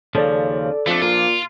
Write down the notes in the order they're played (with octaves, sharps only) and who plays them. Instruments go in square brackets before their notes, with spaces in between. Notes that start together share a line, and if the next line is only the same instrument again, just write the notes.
[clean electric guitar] D#2 C#3 F3 [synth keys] A4 D5
[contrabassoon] F2 [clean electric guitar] F3 D4 [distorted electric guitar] A3
[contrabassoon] A#2 [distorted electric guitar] F4